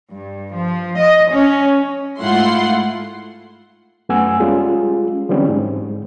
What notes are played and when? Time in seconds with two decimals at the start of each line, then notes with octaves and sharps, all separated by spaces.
0.12 G2
0.53 F3
1.00 D#5
1.31 C#4
2.20 G#2 A3 E4 F4 F#5 C6
4.09 F#2 A3 B3 F#5 G#5 E6
4.40 G3 G#3 C#4 F4 G#4
5.29 D3 E3 F#3 G3 C4 C#4
5.49 G#2